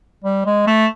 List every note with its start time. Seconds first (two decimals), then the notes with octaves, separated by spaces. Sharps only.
0.24 G3
0.46 G#3
0.67 A3